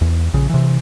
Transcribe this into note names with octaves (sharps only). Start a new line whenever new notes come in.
E2
A#1 C#3
C3 E3